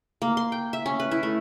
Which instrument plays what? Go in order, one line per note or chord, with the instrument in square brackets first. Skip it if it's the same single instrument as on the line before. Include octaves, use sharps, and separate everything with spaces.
[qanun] A#3
C6
G5
E5
C#4
B4
E4
A3